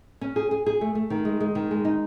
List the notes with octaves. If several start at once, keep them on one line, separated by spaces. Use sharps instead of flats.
C#4
G#4
G#4
G#4
A3
A3
D#3
G#3
G#3
D#3
G#3
D#4